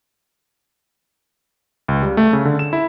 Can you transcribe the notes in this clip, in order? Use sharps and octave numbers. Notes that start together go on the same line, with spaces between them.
C#2
G3
A3
C#3
D3
E7
E4